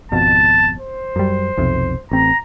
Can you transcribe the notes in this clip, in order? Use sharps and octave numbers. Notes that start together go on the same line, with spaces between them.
G#1 F2 B2 A5
C5
F#2 G3
B1 F2 C3
A1 C4 A#5